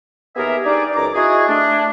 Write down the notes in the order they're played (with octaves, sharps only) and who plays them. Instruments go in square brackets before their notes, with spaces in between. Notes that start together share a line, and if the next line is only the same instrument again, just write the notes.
[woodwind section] D#2 B3 G4 G#4 A#4 E5
G3 D4 D#4 G#4 D5
C#2 F#2 A#5 D6
D#4 E4 F#4 G#4
A3 D4